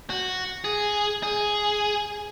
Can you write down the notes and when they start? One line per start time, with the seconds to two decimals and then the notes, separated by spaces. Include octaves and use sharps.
0.10 F#4
0.64 G#4
1.23 G#4